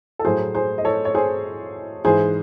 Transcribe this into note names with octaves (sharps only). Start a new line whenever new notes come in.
A4
A2 F#3 A3 G#4 C5
G#4 C5
D#5
A4 C#5
C#5
G#4 C5
G#2 E3 G#3 G#4 C5